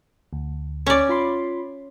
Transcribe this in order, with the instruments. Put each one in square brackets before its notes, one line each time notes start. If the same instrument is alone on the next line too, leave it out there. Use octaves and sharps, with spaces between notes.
[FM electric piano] D2
[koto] C#4 D5
[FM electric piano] F4 B5 C6